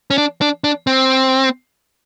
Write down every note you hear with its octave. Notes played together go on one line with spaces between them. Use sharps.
C#4
D4
D4
D4
C4